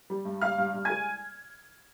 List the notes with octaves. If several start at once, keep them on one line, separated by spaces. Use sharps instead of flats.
G3
G2
G2 F5 F6
G2
G2
G#3 G#5 G#6